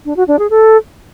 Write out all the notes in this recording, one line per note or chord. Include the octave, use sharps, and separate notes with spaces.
D4
F#4
D4
G#4
A4